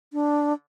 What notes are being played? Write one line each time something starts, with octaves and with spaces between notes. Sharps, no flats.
D4